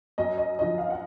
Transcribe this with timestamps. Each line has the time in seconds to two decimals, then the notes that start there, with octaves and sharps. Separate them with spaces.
0.18 F#2 D#5
0.38 D#5
0.59 D3 F3 D#5
0.78 F5
0.90 F#5